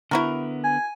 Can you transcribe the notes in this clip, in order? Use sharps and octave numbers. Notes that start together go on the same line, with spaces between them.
D3 B3 E4 F#4 A#4
G#5